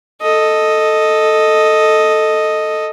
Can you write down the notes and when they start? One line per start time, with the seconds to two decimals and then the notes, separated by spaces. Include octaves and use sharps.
0.22 A4 D#5